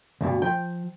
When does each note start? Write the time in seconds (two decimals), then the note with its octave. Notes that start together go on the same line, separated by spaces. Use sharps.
0.21 D2 G2 B2
0.42 F3 G5